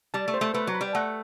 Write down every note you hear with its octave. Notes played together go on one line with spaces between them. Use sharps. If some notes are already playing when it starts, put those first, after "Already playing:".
G3 A5
A3
C5
A3
A3 B4
F#3
B5
G3
A3 F#5